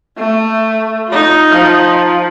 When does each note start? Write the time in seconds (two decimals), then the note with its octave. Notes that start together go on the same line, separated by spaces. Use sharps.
0.18 A3
1.08 D#4 F4
1.52 F3